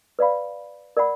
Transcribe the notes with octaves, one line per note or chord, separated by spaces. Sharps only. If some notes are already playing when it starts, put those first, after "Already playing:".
B4 D5 F5 B5
A#4 D5 F#5 B5